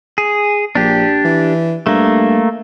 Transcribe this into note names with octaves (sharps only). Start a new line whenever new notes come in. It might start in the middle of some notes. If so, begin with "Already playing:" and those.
G#4
A#1 D4 G4
E3
G2 A3 A#3